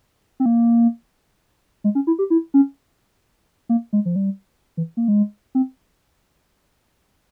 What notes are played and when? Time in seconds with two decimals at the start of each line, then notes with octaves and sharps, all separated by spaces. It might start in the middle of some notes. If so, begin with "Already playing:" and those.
0.40 C4
0.46 A#3
1.84 G#3
1.95 C#4
2.07 E4
2.19 G4
2.30 E4
2.54 C#4
3.69 A#3
3.93 G#3
4.05 F3
4.16 G3
4.77 E3
4.97 A#3
5.08 G#3
5.55 C4